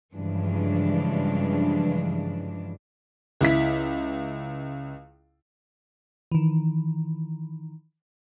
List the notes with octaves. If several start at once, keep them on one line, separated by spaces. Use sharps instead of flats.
G2 C#3 E3 F3 G#3 D4
C#2 E4 B6
D#3 E3